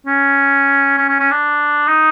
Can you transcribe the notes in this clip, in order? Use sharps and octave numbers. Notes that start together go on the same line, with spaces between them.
C#4
C#4
C#4
C#4
D4
D#4